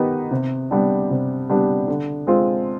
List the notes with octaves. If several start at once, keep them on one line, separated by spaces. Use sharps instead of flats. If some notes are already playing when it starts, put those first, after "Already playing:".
Already playing: D#3 B3 D#4 G4 B4
C3
G3 B3 D4 G4
C3
G3 B3 D4 G4
D3
G#3 C4 F4